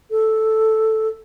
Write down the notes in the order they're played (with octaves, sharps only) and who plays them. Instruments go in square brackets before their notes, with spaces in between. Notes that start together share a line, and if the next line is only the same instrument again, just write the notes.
[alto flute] A4